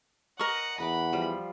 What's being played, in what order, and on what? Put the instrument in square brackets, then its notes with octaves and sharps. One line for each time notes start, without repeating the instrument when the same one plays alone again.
[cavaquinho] A#4 C#6 [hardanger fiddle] D#5 F#5
[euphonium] E2 [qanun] F#5 D6 [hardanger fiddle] B5
[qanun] F3 G3 F4